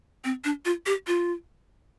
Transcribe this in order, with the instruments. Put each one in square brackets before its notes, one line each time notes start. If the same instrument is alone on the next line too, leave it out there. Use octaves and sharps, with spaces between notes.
[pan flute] C4
D4
F4
G4
F4